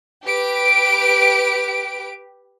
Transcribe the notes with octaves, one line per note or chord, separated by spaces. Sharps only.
G4 B4 D7